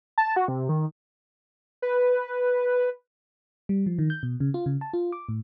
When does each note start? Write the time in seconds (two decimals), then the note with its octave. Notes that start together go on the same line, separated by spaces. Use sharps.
0.18 A5
0.36 F#4
0.48 C3
0.69 D#3
1.82 B4
3.69 G3
3.86 F3
3.99 D#3
4.10 G6
4.23 B2
4.40 C#3
4.54 F4
4.66 C#3
4.81 A5
4.93 F4
5.12 D6
5.29 A2